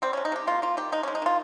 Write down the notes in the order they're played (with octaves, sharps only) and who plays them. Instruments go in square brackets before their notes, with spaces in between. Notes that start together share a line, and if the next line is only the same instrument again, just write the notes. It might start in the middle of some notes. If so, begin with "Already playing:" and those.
[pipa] G3 C4
C3 C#4
D#4
C3 G4
A#3 F4
A#3 F4
D#3 G4
G#3 D#4
G#3 C#4
D#4
D#3 F4